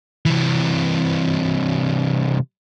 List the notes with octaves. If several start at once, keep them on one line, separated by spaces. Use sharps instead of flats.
C3 E3